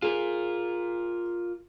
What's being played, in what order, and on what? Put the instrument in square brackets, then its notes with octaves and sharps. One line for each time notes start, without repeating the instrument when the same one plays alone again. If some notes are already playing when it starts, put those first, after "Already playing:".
[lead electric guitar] F4 A#4 [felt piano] G#4